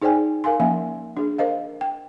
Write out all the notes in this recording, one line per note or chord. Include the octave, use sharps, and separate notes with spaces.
D#4 G#4 C5 D5 G5 G#5
A#4 F5 G#5 C6
F3 A#3 C#4 E5 G#5
D4 G#4
A#4 C5 D#5 F5
G5